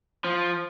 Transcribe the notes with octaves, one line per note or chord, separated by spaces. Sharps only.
F3